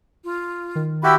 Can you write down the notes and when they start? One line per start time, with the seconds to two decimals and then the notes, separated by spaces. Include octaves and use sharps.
0.22 F4
0.75 D#3
1.04 E4 F#4 G4 G5 B5 E6